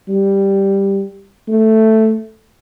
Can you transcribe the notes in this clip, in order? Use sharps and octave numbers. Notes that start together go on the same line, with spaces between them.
G3
A3